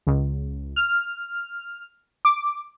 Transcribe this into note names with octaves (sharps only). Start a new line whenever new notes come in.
C#2
F6
D6